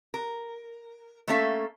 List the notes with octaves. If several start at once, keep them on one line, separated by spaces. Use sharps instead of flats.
A#4
A3 A#3 C#4 A4 E5 F5